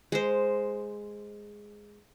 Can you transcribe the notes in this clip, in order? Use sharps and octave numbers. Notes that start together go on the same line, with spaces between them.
G#3 C5